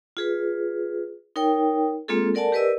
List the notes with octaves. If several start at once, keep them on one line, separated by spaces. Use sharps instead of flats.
F4 G#4 B4
D#4 A#4 C#5 G5
G#3 A#3 C4 F4 G#4 A4
A4 A#4 D5 F#5 G#5 A5
G4 A#4 B4 D5 D#5 E6